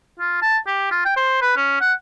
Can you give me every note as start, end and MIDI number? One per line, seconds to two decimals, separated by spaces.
0.20 0.42 65
0.42 0.57 81
0.67 0.88 67
0.92 1.02 65
1.06 1.13 79
1.17 1.41 72
1.42 1.54 71
1.56 1.76 61
1.81 1.93 78